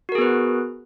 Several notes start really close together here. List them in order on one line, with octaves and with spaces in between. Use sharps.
F#4 A#4 G#4 B3 B4